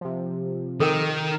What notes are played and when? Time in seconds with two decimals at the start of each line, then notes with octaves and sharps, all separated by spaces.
0.01 C3 F3
0.80 D#3 A4 A#4 G5